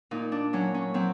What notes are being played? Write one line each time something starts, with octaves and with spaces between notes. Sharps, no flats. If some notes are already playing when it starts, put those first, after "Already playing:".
A#2 D#4
D4
F#3 C#4
C#4
F#3 C4